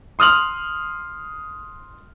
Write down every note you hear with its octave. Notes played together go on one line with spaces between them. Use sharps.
C6 D#6 F6 F7 F#7